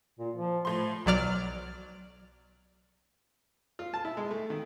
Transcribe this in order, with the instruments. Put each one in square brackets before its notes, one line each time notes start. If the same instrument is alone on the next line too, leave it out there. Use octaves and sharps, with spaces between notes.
[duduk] A#2
F3
[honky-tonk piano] A2 C6 [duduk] F3
[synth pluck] B1 F#3 D5 F6
[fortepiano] F4
A5
E4
G#3
A3
D#3